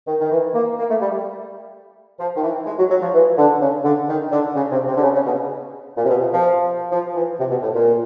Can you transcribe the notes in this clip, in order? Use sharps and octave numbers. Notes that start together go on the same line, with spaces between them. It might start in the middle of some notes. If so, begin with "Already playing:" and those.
D#3
D#3
E3
A#3
A#3
A3
G3
F3
D#3
E3
G#3
F#3
F#3
F3
E3
D3
C#3
D3
D#3
D3
C#3
C3
C3
D3
C#3
C#3
B2
A#2
C3
B2
C3
F3
F3
E3
C3
B2
A2
A#2